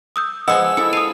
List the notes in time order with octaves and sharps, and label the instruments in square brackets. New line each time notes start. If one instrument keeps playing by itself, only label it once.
[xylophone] D#6 E6 G6
[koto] F3 G#3 B3 [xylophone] D#5 [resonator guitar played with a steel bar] F#5 [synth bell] E6
[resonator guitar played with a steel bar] E4 A4 [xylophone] C#7
[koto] F5 [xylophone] D#6 D#7